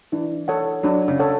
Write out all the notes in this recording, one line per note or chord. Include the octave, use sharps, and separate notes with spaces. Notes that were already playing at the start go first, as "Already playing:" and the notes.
E3 D4
A4 C#5 F#5
F#3 D4
C#3
A4 C#5 F#5